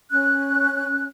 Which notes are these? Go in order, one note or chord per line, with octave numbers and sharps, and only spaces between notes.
C#4 F#6